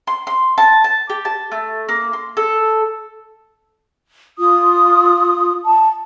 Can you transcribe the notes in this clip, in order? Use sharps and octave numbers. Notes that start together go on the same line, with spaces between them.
C6
C6
A5
A5
G4
A5
A3
A#3
C6
A4
F4 D#6
A5